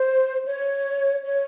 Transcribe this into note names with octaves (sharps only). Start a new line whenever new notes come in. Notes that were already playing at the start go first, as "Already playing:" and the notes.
Already playing: C5
C#5
C#5